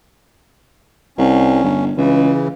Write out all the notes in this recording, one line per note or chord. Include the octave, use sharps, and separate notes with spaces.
C2 C#4
G1
C#2 C#3 E3